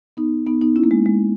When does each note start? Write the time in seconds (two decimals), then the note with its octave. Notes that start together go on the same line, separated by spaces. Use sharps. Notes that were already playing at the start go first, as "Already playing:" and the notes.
0.17 B3 D#4
0.46 B3 D#4
0.61 B3 D#4
0.76 C#4 E4
0.84 A#3
0.91 G#3
1.06 G#3